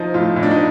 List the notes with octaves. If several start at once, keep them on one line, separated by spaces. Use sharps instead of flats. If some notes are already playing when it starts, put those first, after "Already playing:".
Already playing: F3 D#4
A2 F4
A2 D#4
D4
D#4